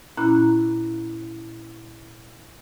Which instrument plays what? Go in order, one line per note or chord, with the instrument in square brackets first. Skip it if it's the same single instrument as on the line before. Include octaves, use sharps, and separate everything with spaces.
[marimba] A#2 C#4 E4 A#5 B5 F#6